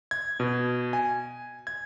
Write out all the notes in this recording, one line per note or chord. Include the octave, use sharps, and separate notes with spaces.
G#6
B2
G#5
G#6